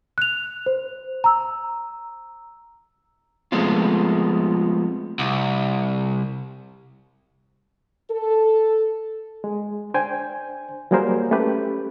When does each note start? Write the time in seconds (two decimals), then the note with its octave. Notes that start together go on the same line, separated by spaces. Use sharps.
0.18 F#6 F7
0.66 C5
1.24 A#5 E6
3.52 F3 G#3 A3 B3 C4 F4
5.19 C2
8.11 A4
9.44 G#3
9.94 D4 C5 G5 G#5
10.91 F#3 G3 A#3 G#4 A#4 C5
11.31 A3 C#4 G4 B4